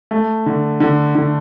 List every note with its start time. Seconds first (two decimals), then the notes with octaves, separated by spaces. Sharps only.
0.11 A3
0.46 D3
0.80 D3
1.15 D3